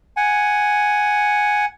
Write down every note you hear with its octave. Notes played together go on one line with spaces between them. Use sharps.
F#5 G#5